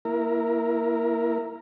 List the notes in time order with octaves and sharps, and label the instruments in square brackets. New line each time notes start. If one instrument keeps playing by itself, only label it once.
[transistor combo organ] A#3 E4 A#4